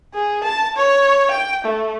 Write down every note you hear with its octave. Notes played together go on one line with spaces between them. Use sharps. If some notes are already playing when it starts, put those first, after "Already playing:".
G#4
A5
C#5
G5
A3